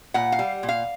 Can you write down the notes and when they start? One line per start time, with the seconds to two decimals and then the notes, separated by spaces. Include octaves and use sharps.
0.14 A#2 F#5
0.32 F5
0.39 G3
0.63 A#2
0.69 F5